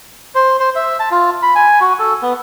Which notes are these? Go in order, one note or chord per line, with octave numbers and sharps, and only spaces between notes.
C5
C5
E5
A5
F4
B5
G#5
F#4
A4
B3